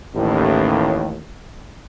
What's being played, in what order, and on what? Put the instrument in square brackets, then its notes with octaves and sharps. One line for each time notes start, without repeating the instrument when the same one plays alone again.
[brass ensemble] A1 D#2 A2